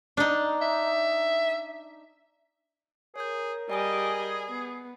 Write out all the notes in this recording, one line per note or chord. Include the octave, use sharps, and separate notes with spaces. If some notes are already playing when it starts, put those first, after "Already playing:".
D4 D#4
E5
G#4 A#4 C#5 G6
G3 G#4 D5 D#5 G#5 D#6
B3